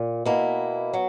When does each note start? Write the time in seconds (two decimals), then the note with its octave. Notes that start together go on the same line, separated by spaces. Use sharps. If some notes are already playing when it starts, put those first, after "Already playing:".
Already playing: A#2
0.25 B2 A#3 E4
0.93 F#3